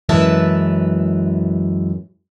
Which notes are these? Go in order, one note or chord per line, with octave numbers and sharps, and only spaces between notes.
F#2 E3 G#3 B4 E5 A5